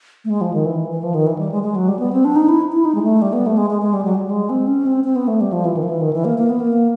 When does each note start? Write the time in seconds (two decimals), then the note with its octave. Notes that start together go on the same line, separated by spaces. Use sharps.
0.25 A3
0.30 G#3
0.41 F3
0.54 D#3
0.66 E3
0.91 E3
1.03 F3
1.14 D#3
1.27 E3
1.39 G3
1.52 G#3
1.63 G#3
1.76 F#3
1.88 G3
1.99 B3
2.13 C4
2.25 D4
2.36 D#4
2.49 E4
2.72 E4
2.85 D#4
2.95 G#3
3.03 A3
3.22 G3
3.33 B3
3.46 A3
3.57 G#3
3.70 G#3
3.82 G#3
3.93 G3
4.05 F#3
4.14 G3
4.27 G3
4.30 G#3
4.50 C4
4.67 C#4
4.86 C4
5.04 C4
5.16 B3
5.28 A3
5.41 G3
5.53 F3
5.65 E3
5.77 D#3
5.83 F3
5.89 E3
6.01 D#3
6.13 E3
6.25 A#3
6.38 A#3
6.50 B3
6.60 A#3